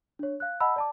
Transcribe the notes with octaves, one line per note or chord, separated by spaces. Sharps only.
D4 C#5
F5 F#6
D#5 F#5 A5 B5 E6
D5 A5 D6